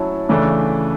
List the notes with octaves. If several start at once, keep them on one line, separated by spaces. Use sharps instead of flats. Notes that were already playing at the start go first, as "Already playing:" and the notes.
Already playing: F#3 C#4 E4 A5
C#3 E3 A3 D4